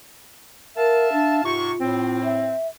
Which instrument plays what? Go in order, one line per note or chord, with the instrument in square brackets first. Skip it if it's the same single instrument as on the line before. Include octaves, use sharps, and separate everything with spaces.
[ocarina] A#4 [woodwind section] E5 F5 A5
[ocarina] D4
[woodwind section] G#2 C3 C#6 [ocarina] F4
[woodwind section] A2 C4
[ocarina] E5